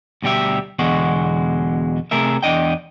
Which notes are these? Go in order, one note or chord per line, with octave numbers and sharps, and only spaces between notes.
D2 B2 G3 G4 E5
E2 B2 D3 G#3 F#4
C3 A3 G#4 A#4 E5
E2 D4 D#5 G5